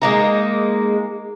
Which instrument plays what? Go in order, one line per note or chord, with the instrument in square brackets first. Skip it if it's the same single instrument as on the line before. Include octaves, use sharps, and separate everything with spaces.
[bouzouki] G#3 A#3 D#4